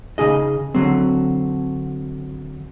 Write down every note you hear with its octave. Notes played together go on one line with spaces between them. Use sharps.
C#3 D#4 G#4 D#5
D3 F#3 C4